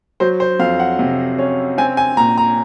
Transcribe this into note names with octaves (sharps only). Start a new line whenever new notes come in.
F#3 C5
C5
F2 F5
F#5
C3
C#4
C4 G#5
G#5
A#2 A#5
A#5